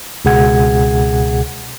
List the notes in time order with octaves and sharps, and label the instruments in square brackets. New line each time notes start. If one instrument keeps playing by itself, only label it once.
[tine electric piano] C#2 B2 G#4 F#5 G#6